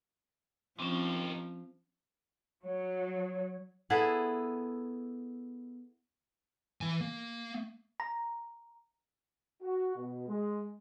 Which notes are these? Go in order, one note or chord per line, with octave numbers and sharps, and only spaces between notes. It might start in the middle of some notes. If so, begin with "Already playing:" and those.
F3 C4 C#4 D#4 G4
F#3 C#5
B3 E4 G#4 A4
E3 G#5
A#3
A#5
F#4
B2
G#3